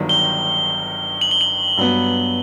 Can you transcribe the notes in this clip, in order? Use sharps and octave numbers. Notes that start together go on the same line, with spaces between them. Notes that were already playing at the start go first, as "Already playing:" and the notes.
Already playing: G1 G2 D#3 F#3
G7
F#7
G7
F#7
G2 F#3 B3